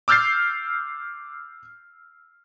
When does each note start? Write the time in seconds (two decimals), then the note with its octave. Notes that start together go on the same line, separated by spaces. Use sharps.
0.08 D6 E6 F6 G6 A6 C7